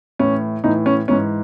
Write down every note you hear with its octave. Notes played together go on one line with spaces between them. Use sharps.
A2 E3 C#4
A2 E3 D#4
C#4
G#2 E3 C#4